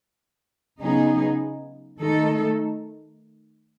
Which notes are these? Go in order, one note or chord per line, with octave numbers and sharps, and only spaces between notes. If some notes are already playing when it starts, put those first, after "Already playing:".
C#3 F#3 B3 D#4 G#4
D#3 A3 D#4 A4